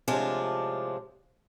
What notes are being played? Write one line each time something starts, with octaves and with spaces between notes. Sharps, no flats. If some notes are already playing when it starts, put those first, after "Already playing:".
A2 C3 F3 G#3 D4 F4